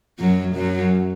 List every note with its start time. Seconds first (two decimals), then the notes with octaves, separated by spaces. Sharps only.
0.19 F#2 F#3
0.55 F#2 F#3